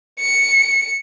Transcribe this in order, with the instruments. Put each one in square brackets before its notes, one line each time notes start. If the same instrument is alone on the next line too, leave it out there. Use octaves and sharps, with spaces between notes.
[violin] C#7